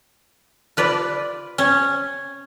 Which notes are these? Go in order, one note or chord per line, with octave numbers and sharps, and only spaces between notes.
F4 B4 D5
C#4